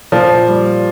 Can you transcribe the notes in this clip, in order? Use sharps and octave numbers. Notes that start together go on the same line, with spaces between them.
A#2 F3
G3